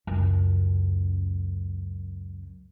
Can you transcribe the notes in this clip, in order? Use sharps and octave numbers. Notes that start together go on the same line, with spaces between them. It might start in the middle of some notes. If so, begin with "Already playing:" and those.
C#2 F#2